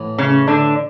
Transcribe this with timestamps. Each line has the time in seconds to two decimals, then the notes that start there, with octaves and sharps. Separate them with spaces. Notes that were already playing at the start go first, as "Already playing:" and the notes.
Already playing: A2 E3 B3
0.18 C#3 C#4
0.47 D3 D4